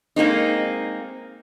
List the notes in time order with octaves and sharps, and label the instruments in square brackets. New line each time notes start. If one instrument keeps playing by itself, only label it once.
[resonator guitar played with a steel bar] G#3 A#3 C4 D#4